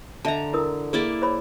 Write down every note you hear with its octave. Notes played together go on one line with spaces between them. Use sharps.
D3 D#5 E5 A5 A#5
E4 A#4 D#6
A#3 E4 G#4 D5
C5 C#5 B5